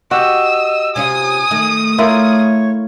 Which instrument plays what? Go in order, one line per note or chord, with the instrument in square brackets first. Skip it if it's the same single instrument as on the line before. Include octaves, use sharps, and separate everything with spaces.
[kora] F#4 G4 [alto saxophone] D#5 [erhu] E6
[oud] C3 C#4 F4 [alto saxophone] G#5 [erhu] D#6
[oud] D#3 A3
[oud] A3 [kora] E4 F4 A#4 [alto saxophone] C#5